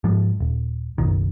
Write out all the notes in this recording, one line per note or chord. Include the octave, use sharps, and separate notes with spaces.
G#2 F3
D#1
F#1 B1 D#3